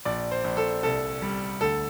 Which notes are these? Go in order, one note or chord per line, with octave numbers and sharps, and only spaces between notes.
A#1 D5
C5
A#1
A4
C2 A4
G3
D2 A4